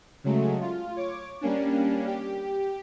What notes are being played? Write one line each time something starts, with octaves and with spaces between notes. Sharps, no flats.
C#3 F#3 G#3 A3
F4
C#5 D6
G3 A#3 C#4 D4
G4